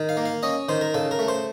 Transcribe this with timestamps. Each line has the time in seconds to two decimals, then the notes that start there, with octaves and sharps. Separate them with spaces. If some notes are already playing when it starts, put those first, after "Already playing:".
Already playing: D#3
0.09 F5
0.17 A#3
0.25 F5
0.43 C#4 D#5
0.69 D#3 C5
0.81 A#4
0.94 C#3 A4
1.11 A#4
1.19 A3
1.28 C5